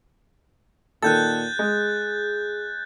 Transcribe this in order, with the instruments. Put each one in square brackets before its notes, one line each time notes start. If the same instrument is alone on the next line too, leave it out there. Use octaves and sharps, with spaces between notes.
[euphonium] A#2 [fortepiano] D#3 A4 [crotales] F#6 G6 A6
[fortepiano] G#3 [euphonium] G#4